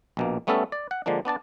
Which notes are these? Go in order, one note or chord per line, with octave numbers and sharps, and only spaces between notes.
A#1 B2 A#3
G3 A3 B3 C#4 A4 E5
D5
F#5
D3 F3 G#3 A#3 D4
B3 D4 D5 A5